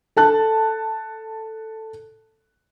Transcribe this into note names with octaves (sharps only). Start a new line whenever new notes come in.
A4 A5 F#6